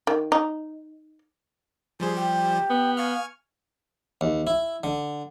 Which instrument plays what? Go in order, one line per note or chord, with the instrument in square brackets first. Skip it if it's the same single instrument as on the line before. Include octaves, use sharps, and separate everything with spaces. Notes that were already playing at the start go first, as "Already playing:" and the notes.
[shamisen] D#3
D#4
[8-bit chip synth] F3 G3 C5 [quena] G#4
[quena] G4
[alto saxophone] B3
[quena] F5 [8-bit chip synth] G#5 C#6 F6
[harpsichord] D#2
E4
D3